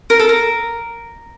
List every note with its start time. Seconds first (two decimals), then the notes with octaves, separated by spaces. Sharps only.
0.10 A#4
0.20 A4
0.29 A#4